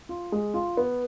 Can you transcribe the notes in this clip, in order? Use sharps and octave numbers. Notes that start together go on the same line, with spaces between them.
F4
G#3
F4
B3